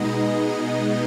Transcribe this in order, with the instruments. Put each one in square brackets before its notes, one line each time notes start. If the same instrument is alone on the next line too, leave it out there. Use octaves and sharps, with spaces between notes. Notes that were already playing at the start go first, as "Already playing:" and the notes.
Already playing: [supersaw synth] B2 G#3 B3 D#4 D#5